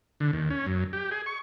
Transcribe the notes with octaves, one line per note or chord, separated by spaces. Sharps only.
D3
D#2
C#4
F#2
G4
G#4
C#6